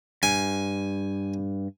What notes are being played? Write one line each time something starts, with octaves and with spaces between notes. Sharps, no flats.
G2 G#5